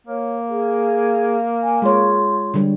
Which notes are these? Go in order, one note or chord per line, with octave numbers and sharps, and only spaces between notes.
A#3 C#5
G#4
G#5
G#3 F4 C#5
D3 G3